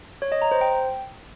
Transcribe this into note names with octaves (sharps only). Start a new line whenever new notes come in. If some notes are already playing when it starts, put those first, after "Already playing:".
C#5
D#5
A#5
C5
G5